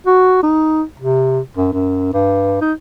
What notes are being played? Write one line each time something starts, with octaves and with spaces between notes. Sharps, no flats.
F#4
D#4
C3
F#2
F#2
G2
D#4